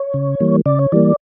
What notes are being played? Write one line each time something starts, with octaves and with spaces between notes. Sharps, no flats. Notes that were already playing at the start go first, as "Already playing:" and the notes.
Already playing: C#5
C#3
E3 G3 A#3
C#3 D5
C#5
E3 G3 A#3 D5